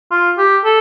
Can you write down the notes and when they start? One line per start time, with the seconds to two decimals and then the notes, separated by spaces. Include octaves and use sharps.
0.11 F4
0.38 G4
0.65 A4